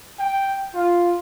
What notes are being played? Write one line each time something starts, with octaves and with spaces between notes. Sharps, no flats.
G5
F4